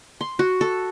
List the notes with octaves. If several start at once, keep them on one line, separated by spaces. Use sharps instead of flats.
C6
F#4
A4